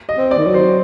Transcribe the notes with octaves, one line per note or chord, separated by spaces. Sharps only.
D#5
C4
D5
D#3
F#3
C5